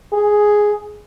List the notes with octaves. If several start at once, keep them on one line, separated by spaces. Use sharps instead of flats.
G#4